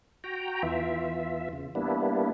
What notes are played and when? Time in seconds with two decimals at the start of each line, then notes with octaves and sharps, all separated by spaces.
0.24 F#4 G5 A#5
0.63 E2 E3 F4 E5
1.53 C#3
1.75 G3 A#3 B3 D4 E4